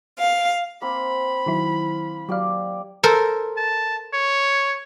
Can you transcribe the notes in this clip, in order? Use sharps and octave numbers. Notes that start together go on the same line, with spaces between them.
F5
A#3 C4 B5
D#3 F#3 E4
F#3 A#3 G4 D5 F5
A4 A#4 C5
A5
C#5